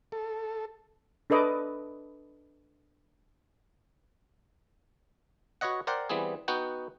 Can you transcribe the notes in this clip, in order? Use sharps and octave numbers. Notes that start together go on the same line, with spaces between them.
A4
D4 A4 B4 D#5 D6
F#4 B4 C#5 D#5 F#5
A#4 C5 D5 F#5 G5
E3 G3 B3 C4 G#4
B3 D#4 F#4 F#5 G5